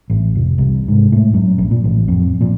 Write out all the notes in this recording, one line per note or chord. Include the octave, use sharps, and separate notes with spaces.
A1
F1
C2
G#2
A2
F#2
A#1
A#2
A1
F2
A#2